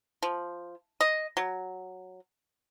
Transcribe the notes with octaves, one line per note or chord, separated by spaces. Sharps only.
F3
D#5
F#3